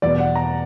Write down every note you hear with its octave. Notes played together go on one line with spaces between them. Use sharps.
E2 B2 D5
F#5
A#5